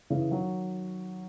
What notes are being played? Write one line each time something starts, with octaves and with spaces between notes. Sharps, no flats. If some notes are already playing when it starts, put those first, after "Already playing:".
C#3 E3
D#3 F#3